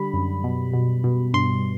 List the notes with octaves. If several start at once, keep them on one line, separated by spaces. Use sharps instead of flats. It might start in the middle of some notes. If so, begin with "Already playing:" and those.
Already playing: D3 G3 B5
F#2
B2
B2
B2
G2 C6